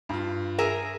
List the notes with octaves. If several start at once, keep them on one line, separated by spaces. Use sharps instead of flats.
G2 F4
G#4 A#4 E5